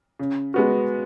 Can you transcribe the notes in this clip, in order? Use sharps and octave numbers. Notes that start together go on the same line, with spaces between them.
C#3
G#3 B3 F#4